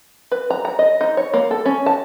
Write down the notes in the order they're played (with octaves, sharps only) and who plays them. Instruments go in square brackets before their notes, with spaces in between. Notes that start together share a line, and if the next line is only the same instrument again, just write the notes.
[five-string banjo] B4
A#5
A#5
D#5
D#4
C#5
A#3
A4
C#4
A5